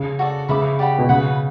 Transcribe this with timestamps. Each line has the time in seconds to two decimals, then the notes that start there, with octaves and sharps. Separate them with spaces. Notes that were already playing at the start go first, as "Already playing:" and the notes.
Already playing: C#3
0.19 F#4 A4 D5
0.49 C#3 B4 E5 B5 D6
0.79 G4 D5 F#5 B5
0.98 B2
1.09 C#3 B4 F#5 B5